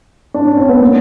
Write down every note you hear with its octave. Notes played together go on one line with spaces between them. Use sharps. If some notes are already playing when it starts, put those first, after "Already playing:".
D4
C#4
C4
B3
A#3